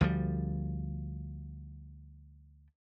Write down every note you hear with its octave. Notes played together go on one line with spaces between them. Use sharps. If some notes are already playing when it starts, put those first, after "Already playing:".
D2 F3 G3